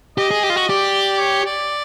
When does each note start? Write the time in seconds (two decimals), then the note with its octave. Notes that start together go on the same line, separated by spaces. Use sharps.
0.18 G4 D#5
0.31 G#4
0.43 G4
0.50 F4
0.56 F#4
0.69 G4 D5
1.20 C#5
1.46 D5